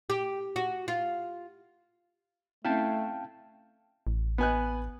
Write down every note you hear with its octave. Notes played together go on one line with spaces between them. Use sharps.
G4
F#4
F4
A3 C4 C#4 E4 F5 G5 A5
A1
B3 G#5 F#6